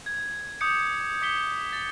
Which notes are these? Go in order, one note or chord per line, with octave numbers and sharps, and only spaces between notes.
G#6
D6 D#6 G6 C#7
D6 B6 C#7 G7
A6